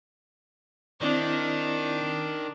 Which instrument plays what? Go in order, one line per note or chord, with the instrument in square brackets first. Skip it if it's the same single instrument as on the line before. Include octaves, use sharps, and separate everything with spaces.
[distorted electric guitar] D#3 [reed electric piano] C4 E4 D5 [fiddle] D4